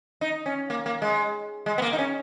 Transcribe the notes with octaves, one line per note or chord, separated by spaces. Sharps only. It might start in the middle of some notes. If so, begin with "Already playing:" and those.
D#4
C#4
A#3
A#3
G#3
G#3
B3
A#3
D#4
C#4